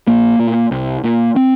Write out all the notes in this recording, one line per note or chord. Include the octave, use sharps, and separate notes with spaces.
A#1 A#3
A#2
C2
A#2
C4